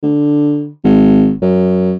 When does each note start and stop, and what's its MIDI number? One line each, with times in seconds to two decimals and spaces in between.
0.03 0.67 50
0.84 1.32 32
1.42 1.93 42